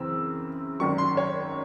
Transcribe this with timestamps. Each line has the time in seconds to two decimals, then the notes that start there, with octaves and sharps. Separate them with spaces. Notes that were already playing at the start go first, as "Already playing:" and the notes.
Already playing: F#2 C#3 E3 C4 E6
0.80 G#1 F#2 D#3 F#3 C#6
0.98 C6
1.17 C#5